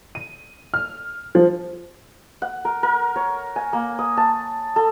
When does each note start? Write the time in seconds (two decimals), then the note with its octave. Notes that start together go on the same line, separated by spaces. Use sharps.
0.15 D#7
0.74 F6
1.35 F3
2.42 F#5
2.65 A#4
2.83 A#4
3.16 C#5
3.56 G#5
3.73 A#3
3.99 D#6
4.17 A5
4.76 A4